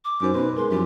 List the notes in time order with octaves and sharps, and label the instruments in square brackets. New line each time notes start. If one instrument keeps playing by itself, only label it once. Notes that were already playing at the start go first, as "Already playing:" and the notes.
[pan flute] D6
[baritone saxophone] F#2 [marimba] D#4 C5
[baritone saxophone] B2 [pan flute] B4 [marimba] C5 C6
[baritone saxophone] G#3 [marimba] A#4 [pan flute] C6
[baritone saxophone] F#2 [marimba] F3 C4 E4 [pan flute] G4